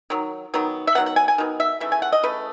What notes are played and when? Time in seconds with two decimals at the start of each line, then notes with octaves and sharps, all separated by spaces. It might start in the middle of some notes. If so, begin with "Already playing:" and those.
0.10 D#3 F#3
0.54 D#3 F#3 B3
0.87 E5
0.95 D#3 F#3 B3 F#5
1.06 F#5
1.16 G#5
1.28 G#5
1.38 D#3 F#3 B3
1.60 E5
1.80 C#3 E3 A3 E5
1.92 G#5
2.02 F#5
2.12 D#5
2.23 C#3 E3 A3 B4